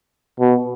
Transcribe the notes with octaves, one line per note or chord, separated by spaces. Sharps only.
B2